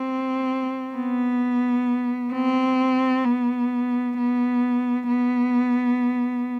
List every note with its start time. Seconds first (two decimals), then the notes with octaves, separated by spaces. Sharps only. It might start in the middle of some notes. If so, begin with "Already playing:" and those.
Already playing: C4
0.95 B3
2.33 C4
3.25 B3
4.17 B3
5.08 B3